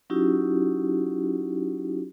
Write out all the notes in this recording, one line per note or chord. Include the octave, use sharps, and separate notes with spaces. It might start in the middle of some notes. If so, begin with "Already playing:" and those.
F#3 C#4 D#4 E4 F#4 G4